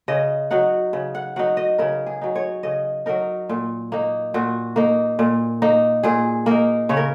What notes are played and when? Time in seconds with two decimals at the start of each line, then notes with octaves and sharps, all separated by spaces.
0.08 C#3 D#5
0.51 F#3 D#4 F#5
0.93 C#3
1.15 F#5
1.36 F#3 D#4 F#5
1.57 D#5
1.78 C#3 A#4
2.07 G#4
2.21 F#3 D#4
2.36 C#5
2.63 C#3 D#5
3.06 F#3 D#4 A#4
3.49 A#2
3.92 A#3 D#4
4.34 A#2 F#4
4.76 A#3 D#4
5.19 A#2
5.62 A#3 D#4
6.03 A#2 G#4
6.46 A#3 D#4 A#4
6.89 C#3 C#5
6.97 A#4